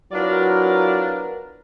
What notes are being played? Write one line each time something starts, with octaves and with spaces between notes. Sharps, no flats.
F#3 B3 D4 E4 F4 A#4 D5